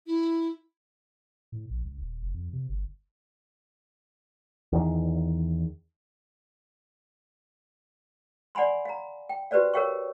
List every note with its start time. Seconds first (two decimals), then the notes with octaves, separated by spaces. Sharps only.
0.07 E4
1.52 A2
1.70 A#1
1.85 C#2
2.00 D#1
2.23 F1
2.34 F2
2.53 C3
2.69 G1
4.73 E2 D#3
8.55 D5 F#5 G#5 B5 C6
8.85 F5 A#5
9.29 G5
9.51 F#4 G4 B4 C5 D5 F5
9.74 A#4 C#5 F5 G5 C#6